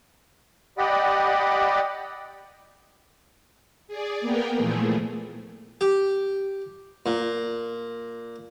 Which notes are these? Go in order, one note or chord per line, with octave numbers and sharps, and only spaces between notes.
G4 D5 D#5 F#5 B5
G#4 D5
A#3 B3 A#4 G5
A#2 E3 F3 A3 G#4
G4
A#2